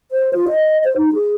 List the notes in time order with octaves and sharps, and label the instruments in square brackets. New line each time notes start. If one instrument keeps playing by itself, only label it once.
[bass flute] C5
F4
D#5
C5
D#4
G#4